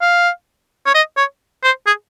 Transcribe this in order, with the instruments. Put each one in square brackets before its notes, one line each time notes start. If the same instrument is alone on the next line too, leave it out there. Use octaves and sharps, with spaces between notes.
[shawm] F5
C#5
D#5
C#5
C5
G#4